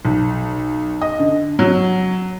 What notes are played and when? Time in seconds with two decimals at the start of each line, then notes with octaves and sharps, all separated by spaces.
0.05 B1
1.02 D#5
1.19 D3
1.59 F#3